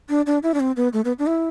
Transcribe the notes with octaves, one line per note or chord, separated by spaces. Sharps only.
D4
D4
E4
D4
C4
B3
A3
B3
D4
E4